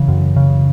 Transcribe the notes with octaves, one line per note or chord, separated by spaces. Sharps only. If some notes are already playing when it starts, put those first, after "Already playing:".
Already playing: C#3 E3
F#2
C#3